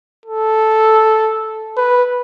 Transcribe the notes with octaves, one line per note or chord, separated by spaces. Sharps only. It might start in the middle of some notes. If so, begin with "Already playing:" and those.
A4
B4